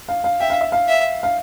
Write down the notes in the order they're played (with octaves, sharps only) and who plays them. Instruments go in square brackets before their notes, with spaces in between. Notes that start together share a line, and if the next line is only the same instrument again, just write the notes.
[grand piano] F5
F5
[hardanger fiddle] E5 [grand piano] G5
[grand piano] F5
E5
F5
[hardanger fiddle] E5
[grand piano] F5